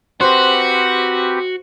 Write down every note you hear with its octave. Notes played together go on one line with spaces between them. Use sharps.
C4 F#4 G4 B4 C5